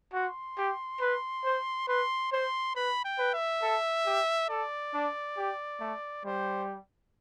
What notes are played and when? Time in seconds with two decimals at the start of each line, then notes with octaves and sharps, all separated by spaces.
0.13 F#4 C6
0.58 G4
1.01 B4
1.44 C5
1.88 B4 C6
2.32 C5 C6
2.75 B4 B5
3.05 G5
3.19 B4
3.34 E5
3.62 A4
4.06 G4
4.49 A4 D5
4.94 D4
5.37 G4
5.80 A3
6.25 G3 C5